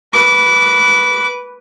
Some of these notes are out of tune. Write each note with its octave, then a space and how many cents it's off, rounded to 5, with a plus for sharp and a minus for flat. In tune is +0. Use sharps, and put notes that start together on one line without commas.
B4 -5 D6 -30